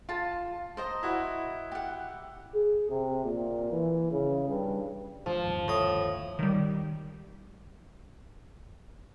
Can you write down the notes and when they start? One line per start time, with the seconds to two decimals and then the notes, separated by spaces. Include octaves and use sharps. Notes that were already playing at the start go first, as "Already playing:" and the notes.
0.09 F4 A5
0.77 C5 D#5 A#5
1.03 E4 F#4
1.72 G4 F#5
2.54 G#4
2.90 C3
3.24 A#2
3.71 E3
4.11 C#3
4.49 G2
5.26 G#1 F3
5.47 G1 D#2
5.68 A2 D#6
6.39 D#3 G3